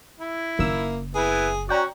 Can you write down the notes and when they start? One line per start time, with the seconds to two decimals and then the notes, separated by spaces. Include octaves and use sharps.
0.20 E4
0.59 F#1 F#2 D#3 A#3 E6
1.15 B3 E4 G#4
1.69 C#4 F#4 D5 G5 A#5